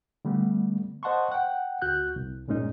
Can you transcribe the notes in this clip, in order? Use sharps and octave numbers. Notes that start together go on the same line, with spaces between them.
D3 G3 A3 B3
C5 D#5 F#5 A5 C6 C#6
F#5 G5
D2 F#4 F#6 G6
C2
G2 A#2 G#3 C#4 D#4